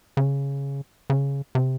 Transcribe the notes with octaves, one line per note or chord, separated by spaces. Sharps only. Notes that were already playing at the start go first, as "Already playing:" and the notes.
C#3
C#3
C3